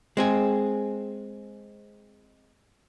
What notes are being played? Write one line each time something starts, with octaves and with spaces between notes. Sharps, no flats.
G#3 C4 G#4